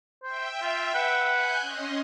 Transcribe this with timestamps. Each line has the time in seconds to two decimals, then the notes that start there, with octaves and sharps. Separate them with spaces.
0.23 C5 E5 G5
0.62 F4
0.94 B4 F#5
1.29 G#5 F#6 G6
1.61 C#4 D#5 C6